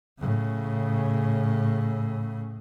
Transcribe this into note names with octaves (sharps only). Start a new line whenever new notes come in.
A2 C#3